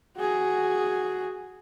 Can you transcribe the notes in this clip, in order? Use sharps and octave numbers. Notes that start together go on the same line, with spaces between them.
F#4 G#4